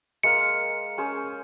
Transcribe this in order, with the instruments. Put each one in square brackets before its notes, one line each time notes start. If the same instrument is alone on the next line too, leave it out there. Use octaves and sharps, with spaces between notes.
[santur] G#3 A#3 F5 [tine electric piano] C#7
[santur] C#4 G#4 C5